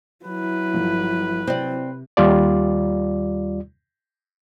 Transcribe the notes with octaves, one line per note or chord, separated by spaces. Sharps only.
F#3 E4 B4
G1 F3
C3 C4 D5
D#2 G3 F4 D5